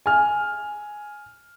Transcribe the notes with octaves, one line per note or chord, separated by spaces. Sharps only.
G#5 F6